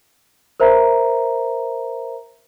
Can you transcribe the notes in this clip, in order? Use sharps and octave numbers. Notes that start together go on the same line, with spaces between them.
A#4 C5 E5 A#5